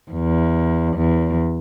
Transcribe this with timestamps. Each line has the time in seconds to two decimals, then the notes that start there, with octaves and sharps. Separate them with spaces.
0.11 E2
0.97 E2